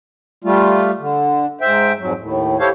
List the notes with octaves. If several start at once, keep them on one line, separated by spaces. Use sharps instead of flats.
G3 A3 F4
D3
G#2 C5 E5 G5
F2 G#2 F#3
D#2 A2
E4 G4 A4 C5 C#5 F5